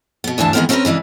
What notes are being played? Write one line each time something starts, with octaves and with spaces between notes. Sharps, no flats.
B2 B3
D2 G2 E3 D4 A5
D#3 E3 G#3 B3 C4 A#4
C4 C#4 E4 G4 A#4 B4
C#3 E3 G#3 D4